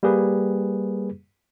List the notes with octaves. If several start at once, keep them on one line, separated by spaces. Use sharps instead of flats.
G3 A#3 G4 G#4 B4